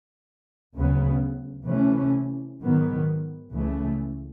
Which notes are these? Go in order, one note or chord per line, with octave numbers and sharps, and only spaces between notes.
D2 C#3 F#3 B3
C3 E3 A3 C#4
G#2 D#3 F#3 B3
C#2 C#3 E3 A3